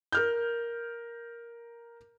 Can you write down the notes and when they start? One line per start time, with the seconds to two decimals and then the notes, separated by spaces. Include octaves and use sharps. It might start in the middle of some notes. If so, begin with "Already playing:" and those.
0.12 A#4 F6 G6